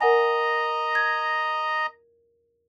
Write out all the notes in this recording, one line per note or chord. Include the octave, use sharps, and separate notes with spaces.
A#4 D#5 F#5 G#5 A#5
G#6